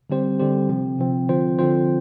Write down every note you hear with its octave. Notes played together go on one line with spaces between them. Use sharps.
D3 G3 C4 G4 C5
D3 G3 C4 G4 C5
C3 F3 C4
C3 F3 C4
D3 F3 C4 F4 C5
D3 F3 C4 F4 C5